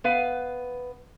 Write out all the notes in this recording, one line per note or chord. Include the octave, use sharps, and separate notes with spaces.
B3 B4 F5